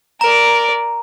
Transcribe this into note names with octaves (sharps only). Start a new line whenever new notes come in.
A#4 D5 A#5